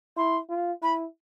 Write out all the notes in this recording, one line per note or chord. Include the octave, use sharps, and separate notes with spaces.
E4 C6
F4
E4 B5